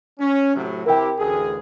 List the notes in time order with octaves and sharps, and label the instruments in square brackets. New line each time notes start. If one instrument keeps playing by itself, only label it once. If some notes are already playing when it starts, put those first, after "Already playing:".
[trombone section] C#4
A2 C3 F#3
[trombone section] C3 E4 G4 [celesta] A#4 G5
[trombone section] A1 D2 G#4